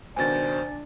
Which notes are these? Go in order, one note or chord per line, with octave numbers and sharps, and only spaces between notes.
C#2 B2 D#3 D4 C5 G#5 A6